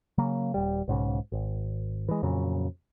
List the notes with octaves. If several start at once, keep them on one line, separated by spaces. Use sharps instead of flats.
C#3 F#3 A#3
D#1 G3
B1 G#2 C#3
G#1
E3 G#3
F2 A#2 C#3 F#3